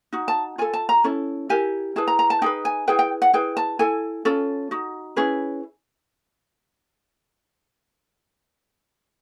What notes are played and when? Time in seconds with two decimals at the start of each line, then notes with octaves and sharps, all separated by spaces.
0.13 D#4 F#4
0.28 A5
0.58 F4 A4 G#5
0.73 A5
0.89 A#5
1.04 C#4 E4 A4
1.49 E4 G4 A#4 G#5
1.96 E4 G#4 B4 A5
2.07 A#5
2.19 A#5
2.30 A5
2.42 D#4 G#4 B4 G5
2.65 G#5
2.88 E4 G#4 B4 G5
2.99 G5
3.22 F#5
3.33 E4 G#4 B4 G5
3.57 A5
3.79 E4 A4 G#5
4.25 C#4 F4 A4
4.71 D#4 F#4
5.16 C#4 E4 G#4 B4